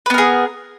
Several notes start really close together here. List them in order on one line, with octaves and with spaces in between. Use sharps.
B4 B3 A#4 G#4